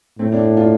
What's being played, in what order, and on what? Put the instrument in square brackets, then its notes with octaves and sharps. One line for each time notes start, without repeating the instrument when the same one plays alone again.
[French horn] A2 [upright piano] A3 C4
[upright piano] A#3 D4
D4 F4